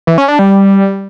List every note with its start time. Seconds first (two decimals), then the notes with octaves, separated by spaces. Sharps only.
0.07 E3
0.18 C#4
0.28 D4
0.39 G3